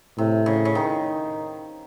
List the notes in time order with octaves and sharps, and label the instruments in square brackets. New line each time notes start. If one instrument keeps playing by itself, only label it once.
[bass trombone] A2 [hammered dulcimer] C3
[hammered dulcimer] C#3
C#3
D#3